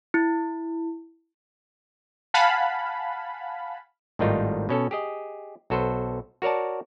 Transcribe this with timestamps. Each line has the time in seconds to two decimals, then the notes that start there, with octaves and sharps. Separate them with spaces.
0.14 E4
2.34 F5 F#5 G#5 A5 B5
4.19 G#1 A2 D#3 G3 D#4 F4
4.69 B2 C#4 A4
4.91 G4 G#4 D#5
5.70 B1 F#4 A4 B4 C5
6.42 F#4 A#4 C#5 D5 A5